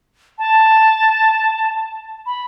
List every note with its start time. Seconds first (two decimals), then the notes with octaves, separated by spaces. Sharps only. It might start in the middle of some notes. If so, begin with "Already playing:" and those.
0.38 A5
2.26 B5